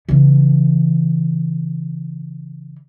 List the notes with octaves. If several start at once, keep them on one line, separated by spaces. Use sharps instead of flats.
C#3 E3